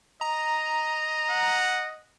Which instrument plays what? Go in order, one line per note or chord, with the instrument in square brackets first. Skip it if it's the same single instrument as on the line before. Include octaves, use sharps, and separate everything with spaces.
[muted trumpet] D#5 [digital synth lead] A#5
[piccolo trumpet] F#5